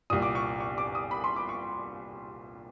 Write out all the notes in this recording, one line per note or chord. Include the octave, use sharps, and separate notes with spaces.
C2 A#2 D#6
D6
C#6
C#6
D6
D#6
B5
C6
D6
C#6